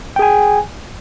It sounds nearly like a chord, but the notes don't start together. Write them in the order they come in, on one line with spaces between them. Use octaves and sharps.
G5 G#4 G#5